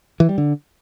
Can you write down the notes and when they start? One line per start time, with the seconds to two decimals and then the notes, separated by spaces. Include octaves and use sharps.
0.20 E3
0.29 G3
0.38 D3